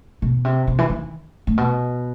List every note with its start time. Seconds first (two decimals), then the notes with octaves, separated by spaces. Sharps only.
0.22 B2
0.45 C3
0.67 C3
0.79 E3
0.90 D#3
1.47 A2
1.58 B2